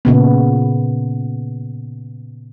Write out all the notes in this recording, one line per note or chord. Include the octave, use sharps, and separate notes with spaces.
A#2 C#3 B3